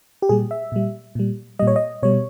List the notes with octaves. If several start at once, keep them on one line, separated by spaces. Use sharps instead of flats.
G4
A#2 G3 G#4
E5
A#2 G3
A#2 G3
A#2 G3 D#5
C#5
D#5
B2 G3 C#5